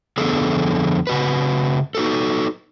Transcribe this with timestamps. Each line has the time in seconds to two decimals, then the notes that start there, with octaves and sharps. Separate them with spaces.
0.18 F2 D3 F3 B3 G#4 A4
1.07 C#3 F#4 B4
1.95 D#4 F#4 A4